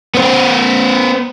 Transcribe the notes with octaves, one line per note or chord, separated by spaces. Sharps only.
B3 C5